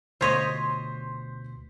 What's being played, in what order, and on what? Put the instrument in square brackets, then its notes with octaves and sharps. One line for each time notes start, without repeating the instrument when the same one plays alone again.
[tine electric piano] D2 B2 B6 [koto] F4 C#5 D#5 [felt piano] C5 C6